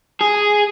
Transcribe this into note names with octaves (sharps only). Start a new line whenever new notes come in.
G#4